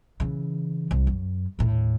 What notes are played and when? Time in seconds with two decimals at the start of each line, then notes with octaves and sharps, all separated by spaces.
0.20 C#3 E3
0.91 C2
1.07 F#2
1.59 D#2 A2